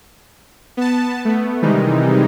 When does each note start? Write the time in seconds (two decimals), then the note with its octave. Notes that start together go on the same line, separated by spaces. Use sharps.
0.77 B3 A5
1.25 A3 B3
1.62 C3 D#3 E3 G3 G#3 D#4